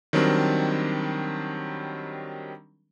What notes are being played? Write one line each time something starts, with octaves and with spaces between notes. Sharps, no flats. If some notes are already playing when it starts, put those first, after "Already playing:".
D#3 F#3 G3 C4 D4 A#4